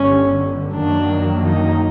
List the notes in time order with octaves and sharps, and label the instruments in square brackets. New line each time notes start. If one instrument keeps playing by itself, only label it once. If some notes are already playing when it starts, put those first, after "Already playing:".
Already playing: [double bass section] G1 G2 D3 G3 [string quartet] C#4
[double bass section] F#2 D#3 F#3 A#3 [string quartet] D4
[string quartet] D#4